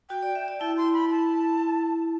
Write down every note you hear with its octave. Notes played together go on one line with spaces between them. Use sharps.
F#4 G5
D5
E5
D5
E4 A5
C6
B5
A5